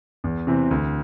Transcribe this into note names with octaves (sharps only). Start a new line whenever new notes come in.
E2
C3 E3 C4
D2